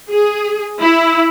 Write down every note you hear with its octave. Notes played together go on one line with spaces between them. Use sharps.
G#4
E4